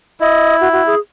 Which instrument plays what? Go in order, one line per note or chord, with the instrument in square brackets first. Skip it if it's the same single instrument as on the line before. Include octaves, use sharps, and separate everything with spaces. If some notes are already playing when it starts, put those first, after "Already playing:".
[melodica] E4 [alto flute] D#5
[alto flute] F#4
F#4
G#4